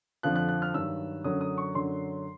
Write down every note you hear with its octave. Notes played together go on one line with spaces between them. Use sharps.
F2 D3 F3 F#6
F#6
F#6
F6
G2 D#3 F#3 E6
F#2 D3 F#3 D#6
D#6
C#6
F#2 D3 F#3 C6